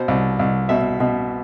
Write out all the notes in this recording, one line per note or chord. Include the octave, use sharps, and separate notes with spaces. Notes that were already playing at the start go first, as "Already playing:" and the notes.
Already playing: B2 C5
C2
C2
B2 E5
B2